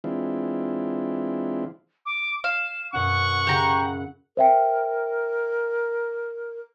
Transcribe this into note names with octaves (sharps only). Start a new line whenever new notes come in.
E3 G#3 C4 D4 E4 F4
D6
F5 E7
F#2 B2 C#4 F#5 C#6
C#3 E4 G4 A#5
A#4 C5 E5 G5